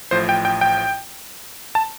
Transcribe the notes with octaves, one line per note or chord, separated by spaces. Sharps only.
A1 A2 F3 C5
G5
G5
G5
A5